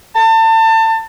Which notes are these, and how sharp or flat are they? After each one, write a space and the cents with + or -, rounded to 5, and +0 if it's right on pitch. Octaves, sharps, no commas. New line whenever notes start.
A5 +30